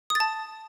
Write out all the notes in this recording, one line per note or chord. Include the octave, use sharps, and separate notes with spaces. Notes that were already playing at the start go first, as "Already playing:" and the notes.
D#6
A6
A5